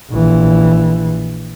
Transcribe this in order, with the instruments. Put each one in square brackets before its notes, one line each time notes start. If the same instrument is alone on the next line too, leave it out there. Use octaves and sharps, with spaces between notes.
[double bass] A#1 E3